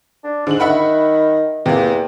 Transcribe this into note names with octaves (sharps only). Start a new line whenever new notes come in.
D4
G#2 D3 F#7
D#3 E5 F#5 B5
E2 C3 A#3